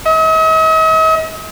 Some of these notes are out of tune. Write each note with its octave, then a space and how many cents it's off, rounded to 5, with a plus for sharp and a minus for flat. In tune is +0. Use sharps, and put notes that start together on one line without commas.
D#5 +45